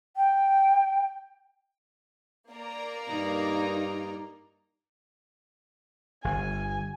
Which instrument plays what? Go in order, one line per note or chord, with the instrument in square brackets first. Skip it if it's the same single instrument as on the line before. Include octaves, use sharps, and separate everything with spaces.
[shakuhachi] G5
[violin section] A#3 D5 A#5
[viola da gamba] G2 D#4
[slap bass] G1 [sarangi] G#5